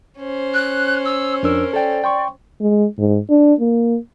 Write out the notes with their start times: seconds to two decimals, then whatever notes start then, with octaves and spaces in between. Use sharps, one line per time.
0.19 C#4 C5
0.53 F#6
1.05 E6
1.43 F2 D4 A#4 E6
1.73 A4 D5 G5
2.04 G5 C6 C#6
2.61 G#3
2.98 G#2
3.29 D4
3.60 A#3